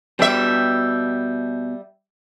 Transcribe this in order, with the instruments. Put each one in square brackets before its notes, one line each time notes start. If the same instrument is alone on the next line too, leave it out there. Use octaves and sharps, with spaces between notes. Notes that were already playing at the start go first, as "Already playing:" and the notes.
[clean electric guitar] B2 B4 G5 [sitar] G3 E5